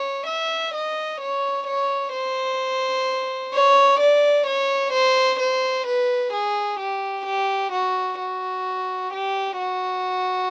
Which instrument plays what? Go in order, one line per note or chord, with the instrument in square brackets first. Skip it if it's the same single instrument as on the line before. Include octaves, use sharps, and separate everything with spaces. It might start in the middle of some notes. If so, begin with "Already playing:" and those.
Already playing: [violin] C#5
E5
D#5
C#5
C#5
C5
C#5
D5
C#5
C5
C5
B4
G#4
G4
G4
F#4
F#4
G4
F#4